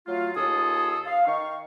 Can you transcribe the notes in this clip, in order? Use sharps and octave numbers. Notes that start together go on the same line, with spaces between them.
F#3 A3 F4
D#2 F4 G#4 A4 D#6
F5
D#3 D#4 F5 C#6